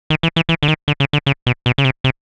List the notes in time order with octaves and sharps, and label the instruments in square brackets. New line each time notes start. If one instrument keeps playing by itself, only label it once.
[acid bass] D#3
E3
E3
E3
D3
D#3
D3
C#3
D3
C#3
B2
B2
C#3
C3
C3